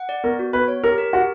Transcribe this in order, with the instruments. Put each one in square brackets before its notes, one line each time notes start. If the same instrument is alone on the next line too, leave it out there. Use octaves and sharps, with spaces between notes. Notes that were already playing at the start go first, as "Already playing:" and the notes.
Already playing: [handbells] F#5
D5
[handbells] B3 [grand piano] A#4
[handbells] F#4
[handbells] B3 [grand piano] B4
[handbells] C#5
[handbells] G4 [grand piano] A#4
[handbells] A#4
[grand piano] F#4 [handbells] G4